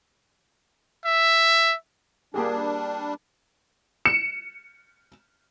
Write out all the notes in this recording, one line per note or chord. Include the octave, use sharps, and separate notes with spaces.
E5
G3 A#3 D4 G4 G#4
C#7 E7